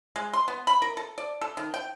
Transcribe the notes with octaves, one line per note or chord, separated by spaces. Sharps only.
G#3
C6
B3
B5
A#4
A4
D5
A4
D#3
G5